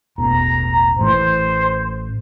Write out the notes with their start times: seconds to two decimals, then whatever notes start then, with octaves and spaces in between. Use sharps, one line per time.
0.18 E1 A1 B3 A#5
0.99 A1 A2 E3 C5